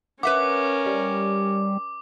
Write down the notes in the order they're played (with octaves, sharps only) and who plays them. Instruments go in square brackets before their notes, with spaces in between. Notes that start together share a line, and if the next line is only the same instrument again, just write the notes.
[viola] C#4 A#4 [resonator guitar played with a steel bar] B4 E5 F#5 [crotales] D6
[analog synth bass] G3